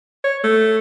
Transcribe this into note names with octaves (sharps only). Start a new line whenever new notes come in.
C#5
A3